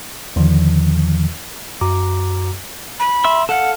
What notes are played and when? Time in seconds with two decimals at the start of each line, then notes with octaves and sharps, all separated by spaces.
0.36 E2 D3 D#3 F3
1.81 F#2 F#4 A#5 D6
3.00 B5
3.24 E5 C6 E6
3.49 A4 F5 F#5